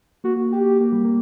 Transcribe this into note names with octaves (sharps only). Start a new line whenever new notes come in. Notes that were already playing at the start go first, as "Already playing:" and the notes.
A#3 F#4
G4
A#3
G3
A#3